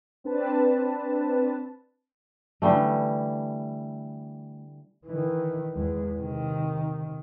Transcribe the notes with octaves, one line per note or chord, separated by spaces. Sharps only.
C4 D4 B4 A5
D3 E3 G3 A3
D#3 E3
E2 G#3
C3 D#3